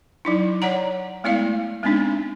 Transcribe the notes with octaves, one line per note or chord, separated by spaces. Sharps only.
F#3 D#4 E4
C#5 D5 F#5 A#5
G#3 A3 B3 E4 D5 F5
G#3 B3 C4 D4 D#4